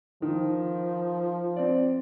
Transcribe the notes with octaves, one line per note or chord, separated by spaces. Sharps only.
D#3 F3
C4 D5